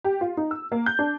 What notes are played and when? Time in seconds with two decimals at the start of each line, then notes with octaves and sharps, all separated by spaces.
0.04 G4
0.21 F4
0.37 D#4
0.51 E6
0.72 A#3
0.86 G6
0.99 D4